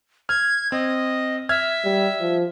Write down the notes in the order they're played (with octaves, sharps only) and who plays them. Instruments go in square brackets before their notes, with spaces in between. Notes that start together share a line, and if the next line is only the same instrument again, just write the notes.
[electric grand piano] F6 [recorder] G#6
[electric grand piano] C4 [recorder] D#5
[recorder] E5 [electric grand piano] F6 G#6
[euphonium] G3
F3